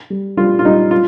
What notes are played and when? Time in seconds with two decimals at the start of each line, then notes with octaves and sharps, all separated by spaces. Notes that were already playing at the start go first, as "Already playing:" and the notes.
0.10 G3
0.37 G3 F4
0.59 F4
0.65 G3 D#4
0.91 F4